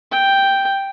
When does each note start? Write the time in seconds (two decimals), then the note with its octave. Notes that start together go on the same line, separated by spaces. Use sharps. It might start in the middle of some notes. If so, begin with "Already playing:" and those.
0.12 G5